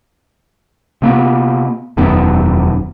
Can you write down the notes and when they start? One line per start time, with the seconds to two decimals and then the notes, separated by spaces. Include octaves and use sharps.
1.02 C3 A#3 B3
1.97 E1 F#2 D#3 B3